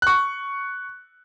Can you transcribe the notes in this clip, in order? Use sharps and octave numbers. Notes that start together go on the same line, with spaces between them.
C#6 F#6